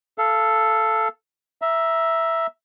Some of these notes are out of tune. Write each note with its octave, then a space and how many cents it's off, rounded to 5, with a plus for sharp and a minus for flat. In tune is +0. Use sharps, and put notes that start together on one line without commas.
A4 +0 F5 -25
E5 +0 A#5 +20